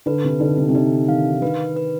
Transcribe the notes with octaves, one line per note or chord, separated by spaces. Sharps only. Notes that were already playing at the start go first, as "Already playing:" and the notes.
D3 B4
C3
D3 D#4
C3
C3
D3 D#4
D#3 F5
D#3 B4
B4